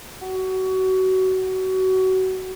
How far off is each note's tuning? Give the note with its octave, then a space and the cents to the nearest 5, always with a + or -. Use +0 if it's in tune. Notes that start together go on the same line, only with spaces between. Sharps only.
F#4 +25